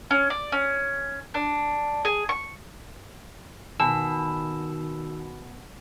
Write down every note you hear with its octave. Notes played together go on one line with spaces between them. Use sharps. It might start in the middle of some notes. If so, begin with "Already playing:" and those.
C#4
D5
C#4
D4
G#4
C#6
B2 D#3 G#5 A5 E6